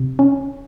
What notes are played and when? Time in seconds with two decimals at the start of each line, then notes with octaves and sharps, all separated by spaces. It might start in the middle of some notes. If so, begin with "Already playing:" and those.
Already playing: C3
0.19 C#4